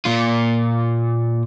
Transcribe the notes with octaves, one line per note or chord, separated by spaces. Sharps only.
A#2 F4